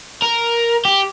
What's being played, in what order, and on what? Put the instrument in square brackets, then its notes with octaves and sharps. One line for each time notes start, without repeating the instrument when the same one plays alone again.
[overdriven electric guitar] A#4
G4